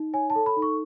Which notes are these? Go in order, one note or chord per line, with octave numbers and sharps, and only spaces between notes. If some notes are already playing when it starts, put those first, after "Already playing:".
Already playing: D#4
C#5 G#5
A5
A4
B5
D#4
C#6